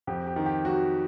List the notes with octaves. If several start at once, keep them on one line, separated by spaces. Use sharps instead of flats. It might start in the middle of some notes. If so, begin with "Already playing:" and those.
F2 G4
G4
D#3
G4
F#3 F#4